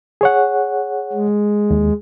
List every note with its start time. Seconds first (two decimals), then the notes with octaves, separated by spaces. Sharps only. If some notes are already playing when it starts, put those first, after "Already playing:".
0.21 G#4 C#5 F#5
1.13 G#3
1.71 D#2